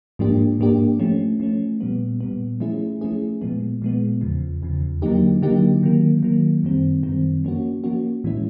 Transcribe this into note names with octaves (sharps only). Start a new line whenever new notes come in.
G#2 F3 A#3 D4 G4
G#2 F3 A#3 D4 G4
F3 A3 C#4
F3 A3 C#4
A#2 G3 B3
A#2 G3 B3
F3 A3 C#4 E4 G#4
F3 A3 C#4 E4 G#4
A#2 F3 G#3 B3
A#2 F3 G#3 B3
E2 C#3 F3
E2 C#3 F3
D3 F#3 A#3 D#4 G4
D3 F#3 A#3 D#4 G4
D#3 F#3 A#3
D#3 F#3 A#3
F#2 D#3 G3 C4
F#2 D#3 G3 C4
F3 A#3 C#4 F#4
F3 A#3 C#4 F#4
A2 E3 G#3 C#4 E4